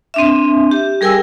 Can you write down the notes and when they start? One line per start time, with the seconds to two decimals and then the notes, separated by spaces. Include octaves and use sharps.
0.14 C4 D4 E5
0.71 G4
1.01 G3 G#4 A#4 G5 G#5 E6